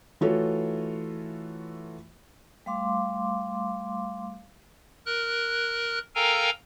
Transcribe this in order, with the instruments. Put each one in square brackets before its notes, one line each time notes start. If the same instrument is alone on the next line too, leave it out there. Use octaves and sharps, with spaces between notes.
[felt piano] E3 A3 F4 F#4 A4 C#5
[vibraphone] G3 A3 F5 C6 D6
[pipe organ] A#4 F#6
A4 A#4 F5 G5 G#5 A#5